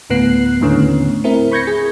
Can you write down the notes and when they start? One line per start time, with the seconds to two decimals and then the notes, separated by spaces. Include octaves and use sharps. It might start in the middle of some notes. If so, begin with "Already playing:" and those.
0.10 D2 A2 B3 F#6 C7
0.61 D#2 A2 D3 B3 C#4
1.24 C4 E4 A#4
1.52 B5 C#6 G6 G#6 A#6 C#7
1.67 G#4